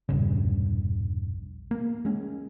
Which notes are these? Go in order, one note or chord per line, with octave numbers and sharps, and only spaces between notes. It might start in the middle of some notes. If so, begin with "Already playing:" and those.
E1 A#1 G2 C#3
A#3
G#3 C#4